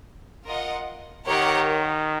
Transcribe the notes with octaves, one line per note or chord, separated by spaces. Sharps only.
F4 A#4 D#5 F#5
D#3 G4 A#4 C#5 F#5